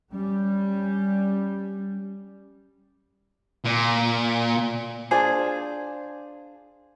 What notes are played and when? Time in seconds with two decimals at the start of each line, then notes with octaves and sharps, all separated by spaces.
0.12 G3 C#4
3.65 A#2
5.11 D4 F4 G#4 C5